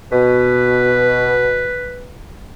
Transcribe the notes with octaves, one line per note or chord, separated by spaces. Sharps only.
B2 B4